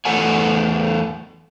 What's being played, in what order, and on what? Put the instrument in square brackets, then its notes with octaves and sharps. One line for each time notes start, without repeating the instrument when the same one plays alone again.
[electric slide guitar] E2 A3 A4 F#5 G#5